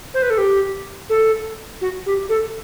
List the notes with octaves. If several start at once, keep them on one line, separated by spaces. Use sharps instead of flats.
C5
B4
A4
G4
A4
F#4
G4
A4